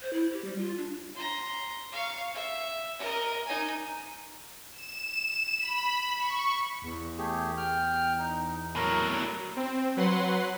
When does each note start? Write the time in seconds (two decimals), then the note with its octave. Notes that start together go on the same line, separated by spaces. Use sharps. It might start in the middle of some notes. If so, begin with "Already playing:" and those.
0.02 C5
0.13 E4
0.32 G4
0.45 G3
0.58 F4
0.78 D4
1.15 A#5 C6
1.92 F5 C#6
2.34 E5
2.99 A#4 D#5
3.45 D#4 G#5
4.71 E7
5.56 B5
6.18 C#6
6.82 E2
7.18 A3 G4 G#4
7.57 G5 F6
8.18 D#4
8.76 A2 F#3 A#4 A#5 F#6
9.56 C4
9.97 F#3 B4 F#5 C6